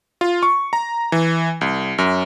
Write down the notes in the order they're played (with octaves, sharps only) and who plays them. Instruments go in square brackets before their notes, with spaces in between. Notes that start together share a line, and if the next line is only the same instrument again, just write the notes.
[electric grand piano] F4
C#6
A#5
E3
C2
F#2